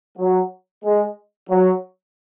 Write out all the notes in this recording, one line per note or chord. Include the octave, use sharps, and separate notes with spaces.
F#3
G#3
F#3